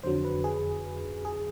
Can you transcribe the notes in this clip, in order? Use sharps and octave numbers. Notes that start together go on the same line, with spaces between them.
F2 D3 F#3 C5
B4
G#4
G#4